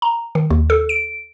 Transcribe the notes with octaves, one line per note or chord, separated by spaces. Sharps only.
A#5
D#3
D#2
A4
D7